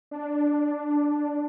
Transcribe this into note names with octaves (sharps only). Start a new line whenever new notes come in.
D4